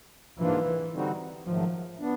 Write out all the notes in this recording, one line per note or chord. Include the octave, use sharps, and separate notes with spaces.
G#2 E3 F3 A#3 D4 F4
D3 G3 C4 D#4 F#4
G#2 D#3 F3 F#3 A3
B3 D4